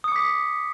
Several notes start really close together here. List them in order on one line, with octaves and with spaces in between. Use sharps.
D#6 C#7 D6 B6